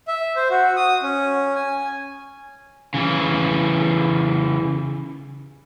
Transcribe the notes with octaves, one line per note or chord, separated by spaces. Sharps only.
E5
C5
F#4
D#6
C#4
G#5
C#3 E3